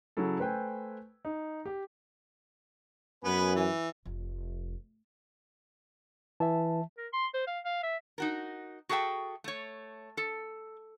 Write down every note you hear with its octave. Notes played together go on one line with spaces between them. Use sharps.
C#3 F#3 C#4 E4 A4
A3 B4 C5 G5 G#5
D#4
G4
F#2 B3 B4 G#5
E3
F1
E3 E5 A5
A#4
C6
C5
F5
F5
E5
D#4 F#4 A#4
F#4 G#4 A4 E5 G5
A3 C#5
A4